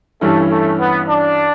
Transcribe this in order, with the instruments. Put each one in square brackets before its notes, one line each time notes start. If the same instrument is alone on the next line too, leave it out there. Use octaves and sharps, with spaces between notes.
[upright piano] G2 E3 G3 C#4 E4 [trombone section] A3
[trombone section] A3
B3
D4